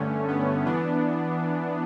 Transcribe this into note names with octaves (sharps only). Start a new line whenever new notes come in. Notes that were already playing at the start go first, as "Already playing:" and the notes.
Already playing: G2 D3 A3 C#4
B3
E3 B3 D4